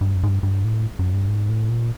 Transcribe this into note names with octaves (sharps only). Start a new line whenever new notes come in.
G2
F#2
G#2
G2
G2
A2
F#2
G2
G#2
A2
A#2